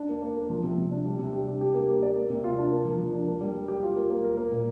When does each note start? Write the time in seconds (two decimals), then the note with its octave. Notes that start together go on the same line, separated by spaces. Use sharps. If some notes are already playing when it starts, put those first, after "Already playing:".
Already playing: D4
0.09 A#3
0.22 A#3
0.36 A#4
0.50 F3
0.63 C3
0.78 C3
0.91 D4
1.05 G3
1.19 C3
1.33 G4
1.47 D4
1.61 G4
1.74 A#3
1.89 A#3
2.03 D5
2.16 A#3
2.30 C3
2.44 F4
2.58 D4
2.71 A#3
2.85 F3
2.99 F3
3.13 D4
3.28 A#3
3.41 G3
3.54 A#4
3.68 G4
3.83 F4
3.96 A#3
4.10 A#3
4.24 A#4
4.37 A#3
4.52 A#2